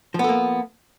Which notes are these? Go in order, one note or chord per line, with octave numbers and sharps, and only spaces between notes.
F3 A#3 B3 A4